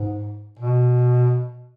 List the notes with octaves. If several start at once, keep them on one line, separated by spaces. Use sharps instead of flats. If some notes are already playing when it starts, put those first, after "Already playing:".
Already playing: G#2
B2